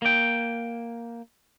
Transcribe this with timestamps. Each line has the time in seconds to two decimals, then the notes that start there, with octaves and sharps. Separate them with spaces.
0.02 A#3 G5